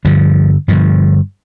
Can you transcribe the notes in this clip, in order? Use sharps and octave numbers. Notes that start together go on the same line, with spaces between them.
G2 D3 F3
G2 D3 F3